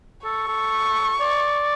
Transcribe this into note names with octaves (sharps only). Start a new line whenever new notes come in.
A4 C#6
A4
D5